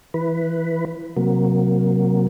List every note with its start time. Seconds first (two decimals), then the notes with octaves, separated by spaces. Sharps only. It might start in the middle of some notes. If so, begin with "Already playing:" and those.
0.14 E3 B4
1.17 C3 F#3 A#3